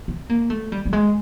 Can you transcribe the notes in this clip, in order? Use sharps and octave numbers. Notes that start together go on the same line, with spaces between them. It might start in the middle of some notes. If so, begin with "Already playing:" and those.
C4
A#3
A3
G3
G3
G#3